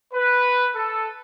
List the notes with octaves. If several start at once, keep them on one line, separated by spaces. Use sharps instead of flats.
B4
A4